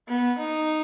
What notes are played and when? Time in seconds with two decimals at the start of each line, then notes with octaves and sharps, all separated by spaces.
0.09 B3
0.39 D#4